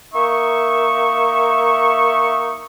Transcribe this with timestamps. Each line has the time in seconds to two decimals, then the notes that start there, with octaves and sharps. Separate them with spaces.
0.14 A#3 D#4 E5 C#6